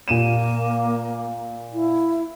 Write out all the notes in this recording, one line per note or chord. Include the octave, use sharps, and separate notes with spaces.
A#2 A#3 D#7 E7
E4